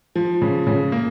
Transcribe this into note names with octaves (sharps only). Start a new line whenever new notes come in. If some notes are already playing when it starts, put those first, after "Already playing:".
F3
C#3
C#3
A#3